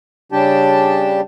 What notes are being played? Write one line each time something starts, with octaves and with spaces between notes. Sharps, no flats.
C#3 G3 D4 G4 G5 A5